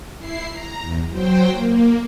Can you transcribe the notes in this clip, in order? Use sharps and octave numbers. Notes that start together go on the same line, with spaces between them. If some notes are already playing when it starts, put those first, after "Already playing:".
E4 C7
A#5
E2
F#3 C5 G5
A#3